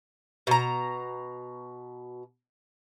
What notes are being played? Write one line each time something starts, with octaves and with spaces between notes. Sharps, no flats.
B2 A#5